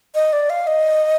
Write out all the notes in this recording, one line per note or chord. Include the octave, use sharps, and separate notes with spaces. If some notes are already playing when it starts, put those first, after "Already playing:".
D#5
D5
F5
D#5